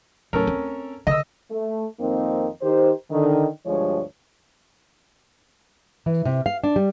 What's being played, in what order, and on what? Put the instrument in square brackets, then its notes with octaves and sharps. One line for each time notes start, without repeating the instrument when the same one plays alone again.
[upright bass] D1 [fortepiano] C#4 A4 A#4
[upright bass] C4
[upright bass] D3 [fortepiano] D#5 E6
[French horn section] A3
F2 D#3 A#3 C4 D#4
D#3 D#4 G4 C5
D3 D#3
D2 G2 F3 G#3 C#5
[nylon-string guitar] E3
C3
F5
D4
G3